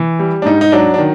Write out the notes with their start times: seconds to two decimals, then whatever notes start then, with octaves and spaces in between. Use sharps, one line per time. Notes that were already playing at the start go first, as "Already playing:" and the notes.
Already playing: E3
0.19 G3
0.42 D4
0.46 G#2 D#4
0.61 D#4
0.72 F#3 D4
0.94 D4
0.99 D#3